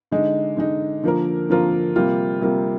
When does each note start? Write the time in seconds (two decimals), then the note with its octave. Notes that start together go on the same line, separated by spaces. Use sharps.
0.12 D3 G#3 D#4
0.57 D3 G#3 D#4
1.03 D3 F3 A#3 F4 A#4
1.49 D3 F3 A#3 F4 A#4
1.96 C3 G3 A#3 F4
2.41 C3 G3 A#3 F4